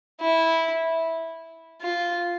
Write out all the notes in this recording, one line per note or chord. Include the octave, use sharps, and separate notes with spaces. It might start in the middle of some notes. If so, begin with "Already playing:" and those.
E4
F4